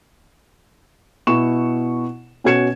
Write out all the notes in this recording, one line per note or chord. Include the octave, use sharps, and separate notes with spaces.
B2 E4 C#6 E7
B2 C#4 F#4 G#6 C#7 E7